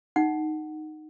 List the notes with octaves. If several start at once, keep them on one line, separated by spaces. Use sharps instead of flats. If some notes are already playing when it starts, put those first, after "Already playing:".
D#4 F#5